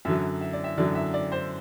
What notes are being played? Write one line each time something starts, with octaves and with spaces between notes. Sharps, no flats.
F#2 D3 F#3 E5
E5
D5
E5
F#2 D3 F#3 D5
E5
D5
C5